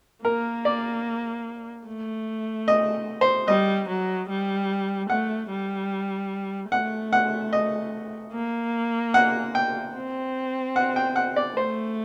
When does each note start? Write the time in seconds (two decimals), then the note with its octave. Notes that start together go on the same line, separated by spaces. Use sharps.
0.24 A#3 A#4
0.65 D5
1.87 A3
2.68 D#5
3.21 C5
3.47 G3 D#5
3.88 F#3
4.29 G3
5.09 A3 F#5
5.50 G3
6.71 A3 F#5
7.13 F#5
7.53 D#5
8.33 A#3
9.14 F#5
9.55 G5
9.95 C4
10.76 F#5
10.96 G5
11.16 F#5
11.36 D5
11.56 A3 C5